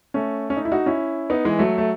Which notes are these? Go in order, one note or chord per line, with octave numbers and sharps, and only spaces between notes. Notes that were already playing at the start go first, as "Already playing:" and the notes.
A3 C#4
C#4
D#4
E4
D#4 F#4
C#4 E4
B3 D#4
E3 G#3
F#3 A3
A3